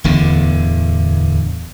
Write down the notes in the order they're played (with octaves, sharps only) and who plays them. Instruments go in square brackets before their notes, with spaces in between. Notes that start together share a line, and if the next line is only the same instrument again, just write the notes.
[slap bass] D1 E2 D3